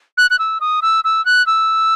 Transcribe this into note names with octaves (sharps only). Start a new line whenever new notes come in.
F#6
F#6
E6
D#6
E6
E6
F#6
E6